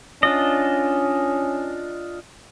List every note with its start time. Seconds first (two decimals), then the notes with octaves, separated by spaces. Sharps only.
0.23 C#4 D4 F4 D#5